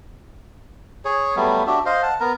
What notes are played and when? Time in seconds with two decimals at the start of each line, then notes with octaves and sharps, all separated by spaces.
1.05 G#4 C#5
1.36 F#3 G3 A3 B3
1.67 D4 F#4 G4 E5
1.86 C5 D#5 F5
2.03 F#5 A5
2.20 B3 A#4 A#5